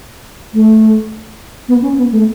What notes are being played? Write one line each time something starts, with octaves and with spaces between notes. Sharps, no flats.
A3
B3
C#4
B3
A3